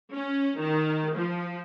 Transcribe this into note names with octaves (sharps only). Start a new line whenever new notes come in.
C#4
D#3
F3